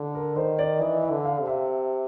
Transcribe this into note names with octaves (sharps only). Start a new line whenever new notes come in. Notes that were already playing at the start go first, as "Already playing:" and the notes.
Already playing: D3
A#4
D#3 C5
D5
E3 D#5
E5
D3
F5
C3
E5